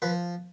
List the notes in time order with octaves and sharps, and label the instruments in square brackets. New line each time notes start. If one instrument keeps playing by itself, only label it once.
[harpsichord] F3 B4